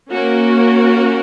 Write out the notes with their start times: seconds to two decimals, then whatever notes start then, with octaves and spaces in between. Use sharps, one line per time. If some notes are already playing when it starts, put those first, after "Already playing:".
0.10 A#3 C#4 F#4 A#4